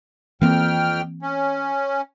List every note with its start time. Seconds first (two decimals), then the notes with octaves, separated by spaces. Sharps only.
0.41 F2 E3 A#3 C4 G5 F6
1.22 C#4